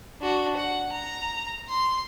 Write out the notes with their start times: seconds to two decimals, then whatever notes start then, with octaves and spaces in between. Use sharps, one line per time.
0.21 D4 F#4
0.57 F#5
0.92 A#5
1.69 C6